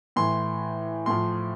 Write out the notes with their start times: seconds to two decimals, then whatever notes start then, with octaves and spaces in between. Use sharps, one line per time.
0.16 A2 E3 C6
1.06 A2 F3 C6